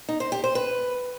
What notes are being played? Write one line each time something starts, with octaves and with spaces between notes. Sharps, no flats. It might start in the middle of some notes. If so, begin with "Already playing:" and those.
D#4
C5
G4
C5
B4